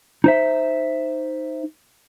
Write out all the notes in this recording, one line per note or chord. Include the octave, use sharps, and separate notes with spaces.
D#4 C5 E5